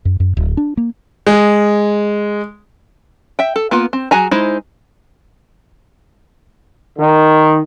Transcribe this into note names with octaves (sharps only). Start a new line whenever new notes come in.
F#2
F#2
D1
D4
A#3
G#3
E5 G5
A4
A#3 B3 F4
C4
F#3 F#4 G#4 G#5 A#5
G#3 D#4 E4 C5
D#3